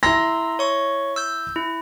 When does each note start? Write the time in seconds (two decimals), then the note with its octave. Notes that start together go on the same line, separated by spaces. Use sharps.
0.03 E4 A#5 C6 E6 A#6
0.59 C#5 C#6
1.16 E6 G6
1.56 E4